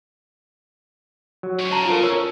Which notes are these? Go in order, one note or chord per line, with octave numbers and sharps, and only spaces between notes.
F#3
G#2 C#5
C#3 A5 A#5
F4 A#4
C#5 E6